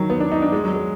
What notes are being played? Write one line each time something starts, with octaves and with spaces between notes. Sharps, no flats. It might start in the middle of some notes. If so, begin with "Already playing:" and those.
Already playing: D#3 F#3
B3
D4
D#4
D4
G#3
F#3
G#3